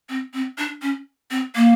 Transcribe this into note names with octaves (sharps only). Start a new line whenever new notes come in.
C4
C4
D4
C#4
C4
A#3